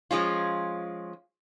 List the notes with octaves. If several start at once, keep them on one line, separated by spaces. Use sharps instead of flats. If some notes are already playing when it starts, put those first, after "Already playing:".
F3 G#3 C#4 F4